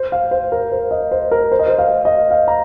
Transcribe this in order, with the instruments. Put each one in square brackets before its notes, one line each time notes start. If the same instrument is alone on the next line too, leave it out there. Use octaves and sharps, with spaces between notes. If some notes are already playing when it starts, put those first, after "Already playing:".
Already playing: [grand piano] C5
F5
C5
A#4
C5
D#5
C5
A#4
C5
D#5
C5
F5
D#5
F5
A#5